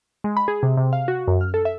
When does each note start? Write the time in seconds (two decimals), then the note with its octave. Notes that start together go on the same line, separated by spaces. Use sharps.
0.24 G#3
0.37 B5
0.48 G#4
0.63 C3
0.77 C3
0.93 F5
1.08 F#4
1.28 F#2
1.41 F6
1.54 A4
1.65 E5